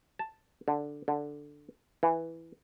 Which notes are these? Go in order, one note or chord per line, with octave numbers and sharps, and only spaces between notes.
A5
D3
D3
E3